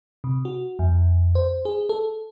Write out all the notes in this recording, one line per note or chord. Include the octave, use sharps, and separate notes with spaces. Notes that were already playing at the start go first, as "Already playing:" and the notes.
C3
F#4
F2
C5
G#4
A4